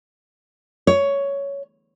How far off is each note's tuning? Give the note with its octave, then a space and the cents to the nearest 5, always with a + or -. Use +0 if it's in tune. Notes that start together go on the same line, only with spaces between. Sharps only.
C#5 +10